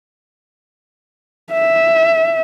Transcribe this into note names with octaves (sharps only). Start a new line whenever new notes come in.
E5